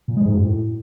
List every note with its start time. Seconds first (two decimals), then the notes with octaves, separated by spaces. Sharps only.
0.08 A#2
0.17 G#3
0.25 G#2
0.34 F#2
0.43 A2